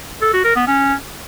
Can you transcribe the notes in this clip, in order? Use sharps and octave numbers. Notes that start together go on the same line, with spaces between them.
A4
F#4
A#4
B3
C#4